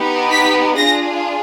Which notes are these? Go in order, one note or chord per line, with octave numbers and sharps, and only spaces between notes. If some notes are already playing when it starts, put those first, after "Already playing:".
Already playing: B3 D#4 G4
B6
D4 F4 G#4 A#6